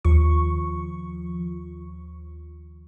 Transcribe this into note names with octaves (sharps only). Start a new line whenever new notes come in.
D#2 F3 C#6